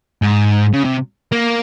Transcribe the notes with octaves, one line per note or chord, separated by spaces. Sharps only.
G#2
C#3
C3
A#3